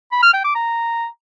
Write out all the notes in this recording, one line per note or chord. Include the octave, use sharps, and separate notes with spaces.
B5
F6
G5
D6
A#5